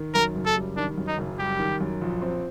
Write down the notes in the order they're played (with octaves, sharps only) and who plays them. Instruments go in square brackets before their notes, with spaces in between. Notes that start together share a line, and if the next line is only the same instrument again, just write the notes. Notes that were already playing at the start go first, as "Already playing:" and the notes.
Already playing: [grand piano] D#3
[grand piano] F#2 [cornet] A#4
[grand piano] F#1
[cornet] A4
[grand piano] G3
[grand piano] D#3 [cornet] D4
[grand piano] F#2
[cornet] D#4
[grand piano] F#1
[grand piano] G3 [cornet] G4
[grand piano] D#3
F#2
A#1
C4